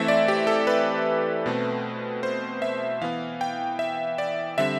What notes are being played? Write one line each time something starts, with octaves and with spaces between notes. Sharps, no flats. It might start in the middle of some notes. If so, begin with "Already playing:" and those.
Already playing: E3 A3 C4 E5
D5
G4
A4
B4
B2 A3 C4
C5
E5
E3 B3 F5
G5
E5
D5
D3 G3 C4 E5